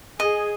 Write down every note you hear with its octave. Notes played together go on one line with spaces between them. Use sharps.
G#4 D#5